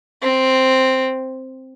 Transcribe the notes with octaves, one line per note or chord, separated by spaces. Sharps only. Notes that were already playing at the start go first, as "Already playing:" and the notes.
C4